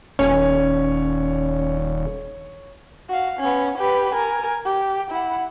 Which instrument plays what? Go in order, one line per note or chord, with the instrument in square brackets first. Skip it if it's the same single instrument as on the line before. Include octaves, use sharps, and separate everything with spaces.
[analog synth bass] D#1 [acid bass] C#4 [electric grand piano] C#5
[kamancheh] F#4 F5
B3 C#4
G4 B4
A#4 G#5
G4
E4 F#5